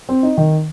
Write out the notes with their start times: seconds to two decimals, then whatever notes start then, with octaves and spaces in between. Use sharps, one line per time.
0.09 C4
0.23 D#4
0.37 D#3